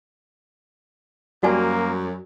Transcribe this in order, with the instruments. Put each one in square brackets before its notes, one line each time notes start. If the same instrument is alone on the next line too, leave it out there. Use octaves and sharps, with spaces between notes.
[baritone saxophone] F#2 [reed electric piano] G3 [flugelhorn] A#3 [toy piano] F#4 D5 G#5